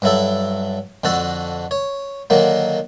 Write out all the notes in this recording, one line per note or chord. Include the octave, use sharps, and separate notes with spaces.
G2 F#3 E4 A4
F2 D3 F#4 A4 A5
C#5
D3 D#3 F#3 A#3